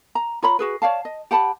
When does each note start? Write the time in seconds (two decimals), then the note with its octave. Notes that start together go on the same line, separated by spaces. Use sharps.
0.15 A#5
0.42 F4 C#5 A#5 B5
0.59 F#4 G#4 B4
0.82 C#5 D5 F5 A5
1.05 D#5
1.31 G4 F#5 A5 B5